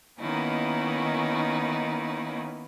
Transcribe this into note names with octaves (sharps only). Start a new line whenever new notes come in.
D#3 A#3 B3 C#4 D#4 E4